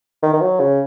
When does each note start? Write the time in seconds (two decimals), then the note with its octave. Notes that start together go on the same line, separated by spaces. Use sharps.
0.23 D#3
0.33 D#3
0.41 F#3
0.60 C#3